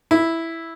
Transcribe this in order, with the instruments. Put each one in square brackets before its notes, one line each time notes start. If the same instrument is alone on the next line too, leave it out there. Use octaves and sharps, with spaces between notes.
[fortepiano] E4